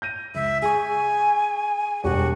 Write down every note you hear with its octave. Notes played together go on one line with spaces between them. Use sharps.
G6 A#6 D#7
C#2 E5
G#4 G#5 C#6
E1 G3 F#4 G4